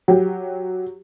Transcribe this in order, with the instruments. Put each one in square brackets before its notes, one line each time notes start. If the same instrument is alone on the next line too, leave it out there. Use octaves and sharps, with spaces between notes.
[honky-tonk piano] F#3 G4